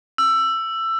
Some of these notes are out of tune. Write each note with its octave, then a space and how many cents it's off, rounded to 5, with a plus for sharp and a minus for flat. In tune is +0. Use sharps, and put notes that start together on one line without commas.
E6 +15